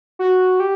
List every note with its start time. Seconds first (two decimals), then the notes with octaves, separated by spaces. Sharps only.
0.19 F#4
0.60 G4